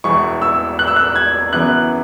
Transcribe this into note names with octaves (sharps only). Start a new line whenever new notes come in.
E1 E2 E3 C#6
E6
F#6
E6
F#6
G#6
F#2 C#3 E3 B3 F#6